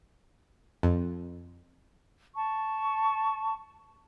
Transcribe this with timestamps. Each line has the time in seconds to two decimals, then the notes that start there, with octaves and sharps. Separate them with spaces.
0.83 F2
2.36 A5 C#6